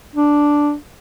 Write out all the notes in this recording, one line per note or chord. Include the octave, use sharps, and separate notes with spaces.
D4